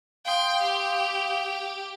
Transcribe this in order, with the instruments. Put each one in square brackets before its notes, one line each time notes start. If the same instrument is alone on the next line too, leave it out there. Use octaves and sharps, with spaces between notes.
[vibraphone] F5 D#6 [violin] G5 C6
[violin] G4